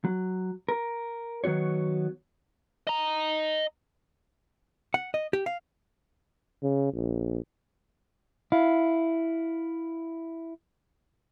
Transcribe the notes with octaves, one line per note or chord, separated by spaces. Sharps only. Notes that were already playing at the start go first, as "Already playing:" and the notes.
F#3
A#4
D#3 F#3 B3 F#4 C#5
D#5 A#5
F#5
D#5
G4
F5
C#3
A#1
E4 F5